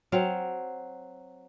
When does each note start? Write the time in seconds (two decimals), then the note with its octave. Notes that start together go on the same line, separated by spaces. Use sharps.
0.12 F#3 C4 F5